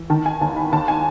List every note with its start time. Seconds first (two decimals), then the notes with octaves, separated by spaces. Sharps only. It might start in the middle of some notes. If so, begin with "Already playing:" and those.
Already playing: E3
0.10 D#3 A5
0.26 G#5
0.41 D#2 A5
0.56 B5
0.72 D#2 A5
0.88 G#5